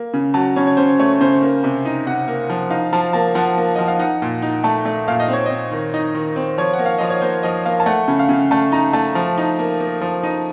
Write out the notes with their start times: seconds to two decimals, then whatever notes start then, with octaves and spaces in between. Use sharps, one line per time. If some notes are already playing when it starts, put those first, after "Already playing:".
Already playing: A#3
0.14 C#3
0.34 F#3 A5
0.56 C#3 C#5
0.67 C#5
0.77 C#3 C5
0.99 A3 C#5
1.21 C#3 C5
1.42 A#3
1.64 C3
1.85 D#4
2.06 C3 F#5
2.28 A#3
2.50 F3
2.70 D#4 F5
2.93 F3 A5
3.13 A#3 A5
3.35 F3 F#5
3.57 A#3
3.75 F3 D#5
3.88 F5
3.99 D#4 F#5
4.22 A#2
4.42 D#4
4.64 A3 A5
4.85 A3
5.08 A#2 F5
5.20 D#5
5.28 C4 C#5
5.46 C4 D#5
5.71 D#3
5.94 D#4 D#5
6.15 D#3
6.36 C4
6.58 F3 C#5
6.73 F#5
6.79 A#3
6.86 F5
6.98 F3 D#5
7.10 C#5
7.22 A#3 C5
7.43 F3 D#5
7.65 A#3 F5
7.80 A5
7.86 A3 F#5
8.08 C#3
8.19 F5
8.29 C#3
8.51 A3 A5
8.72 D#4 A#5
8.93 A3 A5
9.15 F3
9.38 D#4
9.59 A#3
9.80 A#3
10.01 F3
10.23 D#4